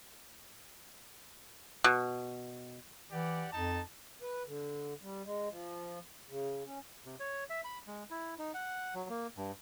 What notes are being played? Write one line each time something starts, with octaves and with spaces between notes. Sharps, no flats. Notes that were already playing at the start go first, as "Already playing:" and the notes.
B2
E3 G4 D5 F#5
F2 D#4 A5
B4
D3
G3
G#3
F3
C#3
C#4
C3
C#5
E5
B5
G#3
E4
D#4
F#5
F#3
A#3
G2